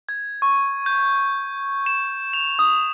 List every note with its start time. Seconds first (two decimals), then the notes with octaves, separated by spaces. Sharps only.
0.09 G#6
0.42 C#6
0.86 G6
1.86 E7
2.33 F7
2.59 D#6